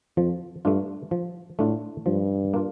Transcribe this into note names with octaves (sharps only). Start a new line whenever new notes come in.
F2 F3
G2 A3 D4 F4
F3
A2 A3 D4 F4
G2 F3
A#3 D4 F4